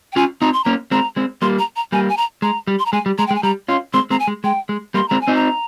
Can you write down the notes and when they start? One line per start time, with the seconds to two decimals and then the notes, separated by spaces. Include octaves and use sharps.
0.12 G5
0.16 C#4 F4 G#5
0.41 C4 D#4 A#5
0.53 C6
0.64 A#3 C#4 A#5
0.91 G#3 C4 A#5
1.16 G#3 C4
1.41 G3 A#3 C6
1.59 A#5
1.76 A#5
1.92 G3 A#3 G#5
2.09 G#5
2.17 A#5
2.42 G#3 A#5
2.67 G3
2.79 C6
2.86 A#5
2.93 G#3 G#5
3.06 G3
3.18 G#3 A#5
3.27 G5
3.31 G#3
3.35 G#5
3.43 G3 A#5
3.68 C#4 F4 C6
3.93 G#3 C4 C6
4.10 G#3 C4 A#5
4.19 G#5
4.27 G#3
4.44 G#3 G5
4.69 G#3
4.94 G3 A#3 C6
5.08 G#3 C4 A#5
5.21 G#5
5.28 C4 D#4
5.35 A#5